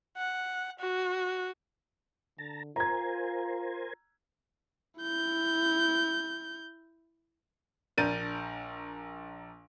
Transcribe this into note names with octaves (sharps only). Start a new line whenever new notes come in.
F#5
F#4
D3 A5 A#5
F4 A#4 C5 G#5 A#5 G#6
E4 G6
A#1 D4 A#4 G6 A6 D#7